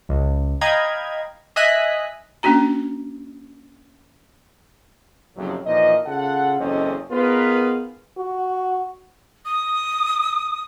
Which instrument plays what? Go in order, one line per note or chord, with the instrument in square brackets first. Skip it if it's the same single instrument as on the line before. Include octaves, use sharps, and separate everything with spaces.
[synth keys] C#2
D#5 F5 G5 A#5 B5 G#6
D#5 E5 G#5 D#6 F#6 B6
[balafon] A#3 C#4 D4 F#4 A#5
[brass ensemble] F#1 F2 A2 C3 F#3
A#2 E3 F3 D#4 D#5
C#3 F4 A4 F#5
F#1 E2 C4 C#4 A4 D#5
B3 D#4 F4 G#4 A#4 B4
[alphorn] F#4
[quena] D#6